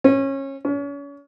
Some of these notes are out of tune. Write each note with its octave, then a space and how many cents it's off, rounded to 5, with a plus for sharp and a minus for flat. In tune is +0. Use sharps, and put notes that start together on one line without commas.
C#4 -25
C#4 +35